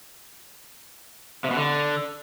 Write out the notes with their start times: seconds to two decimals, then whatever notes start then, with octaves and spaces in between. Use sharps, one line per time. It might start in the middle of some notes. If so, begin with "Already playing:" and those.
1.44 C3
1.51 B2
1.57 D3